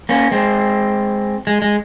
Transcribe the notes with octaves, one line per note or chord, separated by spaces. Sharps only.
A#3 C#4
G#3 C4
G#3
G#3